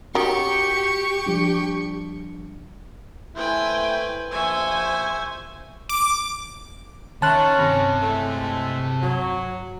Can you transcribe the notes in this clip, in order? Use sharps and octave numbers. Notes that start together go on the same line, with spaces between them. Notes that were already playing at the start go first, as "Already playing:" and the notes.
D#3 C#4 F#4 G4 C#6
F3 G3 D4
A3 E4 B4 C5 G5 G#5
A#1 F3 C5 E5 G#5 C#6
D6
D#3 C#4 E5 A5 B5 C6 F#6
G2 C3
A2 G#3 A3
F#3